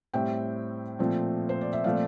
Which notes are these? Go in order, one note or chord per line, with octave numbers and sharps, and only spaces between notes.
A2 G3 C4 E5 G5
A#2 F3 A3 C4
C5
D5
E5
A#2 F3 A3 C4 D5 F5